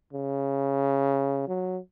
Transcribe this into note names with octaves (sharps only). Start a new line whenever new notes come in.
C#3
F#3